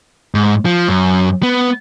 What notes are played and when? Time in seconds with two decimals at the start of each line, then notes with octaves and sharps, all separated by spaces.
0.35 G#2
0.65 F3
0.89 F#2
1.43 B3